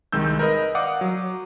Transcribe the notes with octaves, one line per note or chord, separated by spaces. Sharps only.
C2 D#3 G#3 E6 G6
A#4 B4 D#5
D5 F5 F#5 D6 D#6
F#3